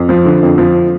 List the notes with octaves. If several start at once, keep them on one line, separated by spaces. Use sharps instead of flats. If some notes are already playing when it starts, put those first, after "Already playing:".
Already playing: F2
F3
D3
F2
F3